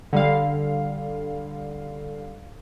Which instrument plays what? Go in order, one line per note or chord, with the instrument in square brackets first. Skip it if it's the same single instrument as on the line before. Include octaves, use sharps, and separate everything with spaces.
[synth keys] D3 G3 F5